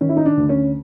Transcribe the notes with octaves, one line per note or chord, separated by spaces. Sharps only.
D#3 C#4
E4
D#4
D4
D2
C#4